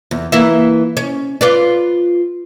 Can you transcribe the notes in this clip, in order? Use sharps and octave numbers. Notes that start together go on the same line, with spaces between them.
E2
E3 A#3 E4
C#4
F4 B4 D5